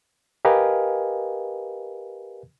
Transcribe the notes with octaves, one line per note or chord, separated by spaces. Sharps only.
G4 A#4 B4 D#5 F5 G#5